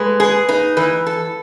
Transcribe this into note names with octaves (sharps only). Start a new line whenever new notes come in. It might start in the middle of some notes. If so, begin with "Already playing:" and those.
Already playing: G#3 A4 B4
G#4 B4
D#4 B4
E3 B4
A4